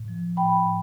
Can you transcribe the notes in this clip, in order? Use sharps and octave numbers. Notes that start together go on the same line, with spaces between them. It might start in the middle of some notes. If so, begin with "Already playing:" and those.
Already playing: A2
F3
A2 G5 B5
A2